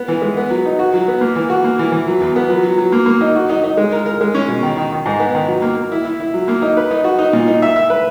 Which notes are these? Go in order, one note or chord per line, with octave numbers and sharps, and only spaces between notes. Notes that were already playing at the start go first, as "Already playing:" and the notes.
Already playing: B3
E3
G#3
B3
F#3
D#4
F#4
F#3
B3
A#3
E3
F#4
A#3
E3
E3
F#3
E2
B3
F#3
F#3
F#3
A#3
A#3
D#4
F#4
D#4
D#4
G#3
A#4
A#4
G#3
C#4
B2
D#3
D#3
D#3
G#2
B3
D#3
F#3
A#3
A#3
E4
E4
E4
F#3
A#3
D#4
B4
D#4
F#4
D#4
A#2
D#4
E5
E5
B4